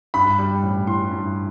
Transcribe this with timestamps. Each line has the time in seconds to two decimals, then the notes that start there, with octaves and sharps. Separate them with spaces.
0.14 G2 B5
0.38 G3
0.63 A1
0.87 E3 C6
1.11 G2